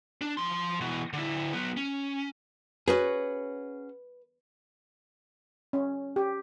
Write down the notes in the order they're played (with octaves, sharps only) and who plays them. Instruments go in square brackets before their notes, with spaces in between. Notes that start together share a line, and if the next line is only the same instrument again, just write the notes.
[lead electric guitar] D4
F3 C6
B2 E3
D3 E4
F#3 B3
C#4
[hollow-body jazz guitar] C#4 F#4 G#4 [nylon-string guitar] B4
[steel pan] C#4
G4